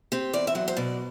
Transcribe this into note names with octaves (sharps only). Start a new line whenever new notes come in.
C4 G4
E2 D5
E5
F#3 F#5
C5
B2 D5